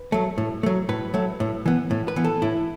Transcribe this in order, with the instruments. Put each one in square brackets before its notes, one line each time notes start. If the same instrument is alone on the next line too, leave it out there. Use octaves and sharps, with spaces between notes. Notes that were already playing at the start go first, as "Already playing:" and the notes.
Already playing: [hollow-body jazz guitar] B4
F#3 A3
A2
F#3 A3
A2 B4
F#3 A3
A2
E3 B3
A2
B4
E3 B3
A4
A2 E4